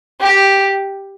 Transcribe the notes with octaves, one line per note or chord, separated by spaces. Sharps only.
G4